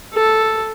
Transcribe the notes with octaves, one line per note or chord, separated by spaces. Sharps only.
A4